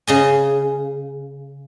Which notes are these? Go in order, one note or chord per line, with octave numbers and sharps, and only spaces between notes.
C#3 D#5 G#5